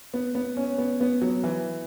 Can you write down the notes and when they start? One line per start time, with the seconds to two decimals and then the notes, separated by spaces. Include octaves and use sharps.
0.14 B3
0.35 B3
0.57 C#4
0.78 B3
1.01 B3
1.22 F#3
1.44 E3